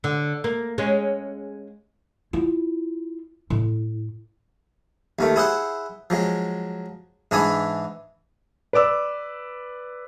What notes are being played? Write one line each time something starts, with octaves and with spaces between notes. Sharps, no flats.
D3
A#3
G#3 C#4
E4 F4
A2
D#2 D#3 A3
E4 G#4 C5 F#5
F3 F#3 G#3
G#2 E3 D4 E4 G#4 G#5
B4 D5 D6 E6